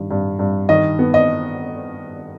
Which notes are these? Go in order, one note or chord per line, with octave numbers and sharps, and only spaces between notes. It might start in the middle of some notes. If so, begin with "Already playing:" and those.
Already playing: G2 D#3
G2
G2
D#3 D#5
B3
D#5